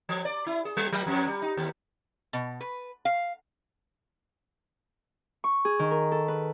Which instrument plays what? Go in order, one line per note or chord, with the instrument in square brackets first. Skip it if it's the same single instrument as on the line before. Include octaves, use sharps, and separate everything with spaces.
[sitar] F3
D5
E4
G#4
G3
F#3
F2
G3
D#4
D#2
[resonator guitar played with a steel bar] B2
B4
F5
[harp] C#6
G#4
D#3
A#4
A4
B4